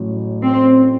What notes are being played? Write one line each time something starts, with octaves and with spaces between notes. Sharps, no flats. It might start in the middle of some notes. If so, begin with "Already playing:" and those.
Already playing: A1 A2 F#3
C4